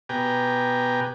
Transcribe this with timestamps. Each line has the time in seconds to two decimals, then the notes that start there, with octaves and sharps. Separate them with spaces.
0.09 B2 G4 B4 G5 G#5 A#5